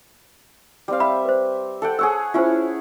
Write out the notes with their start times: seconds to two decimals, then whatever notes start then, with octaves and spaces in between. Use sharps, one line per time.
0.88 G3 C4 F5
1.00 E5 B5
1.25 B4 C5
1.82 A4 F#5 G5
1.99 G#4 C#5 F#5 E6
2.34 C#4 E4 F4 C5